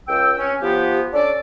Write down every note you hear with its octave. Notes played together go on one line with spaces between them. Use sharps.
C#2 G5 E6
C#4
F3 B3 G4
C#4 D4 A4 D5